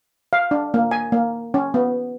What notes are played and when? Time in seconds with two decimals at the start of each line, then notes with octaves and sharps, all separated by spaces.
0.33 F5
0.51 D4
0.74 A#3
0.91 G#5
1.12 A#3
1.54 C#4
1.74 B3